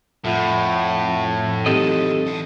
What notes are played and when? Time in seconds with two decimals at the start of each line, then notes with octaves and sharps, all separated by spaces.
0.25 F2 A2 F4 E5 F#5
1.66 E3 F#3 C4 D#4 G4 A4 D#5
2.26 E3 A4